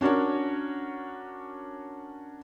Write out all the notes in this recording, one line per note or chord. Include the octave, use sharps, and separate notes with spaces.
C#4 D4 F#4 A#4 C#5